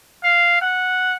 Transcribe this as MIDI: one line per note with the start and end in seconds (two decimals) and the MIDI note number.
0.24 0.59 77
0.62 1.16 78